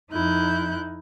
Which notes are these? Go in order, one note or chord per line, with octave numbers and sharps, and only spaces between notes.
F2 D#4 E4 F#6 G6